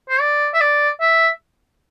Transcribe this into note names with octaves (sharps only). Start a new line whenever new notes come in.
C5
D5
E5
D5
E5